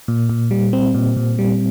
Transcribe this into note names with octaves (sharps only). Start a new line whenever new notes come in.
A#2
A#2
G3
C4
A#2
A#2
G3